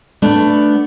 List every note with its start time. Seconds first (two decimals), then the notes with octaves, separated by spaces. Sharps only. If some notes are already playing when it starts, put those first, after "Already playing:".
0.22 A3 B3 D4